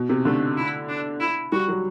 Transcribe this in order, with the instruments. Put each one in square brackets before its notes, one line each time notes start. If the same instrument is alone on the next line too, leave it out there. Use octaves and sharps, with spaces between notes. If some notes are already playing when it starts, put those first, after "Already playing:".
Already playing: [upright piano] B2
C3
[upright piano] D3 [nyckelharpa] A3
[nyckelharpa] E4
D4
E4
[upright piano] G3 [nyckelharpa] F#4
[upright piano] F#3